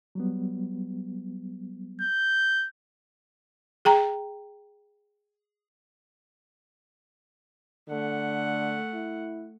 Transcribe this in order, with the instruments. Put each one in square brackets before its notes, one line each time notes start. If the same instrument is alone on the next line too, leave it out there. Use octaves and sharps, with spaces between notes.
[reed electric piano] F#3 G3 B3
[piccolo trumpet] G6
[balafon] G#4 G5 A#5
[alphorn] D3 [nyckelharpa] A3 F#5
[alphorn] E4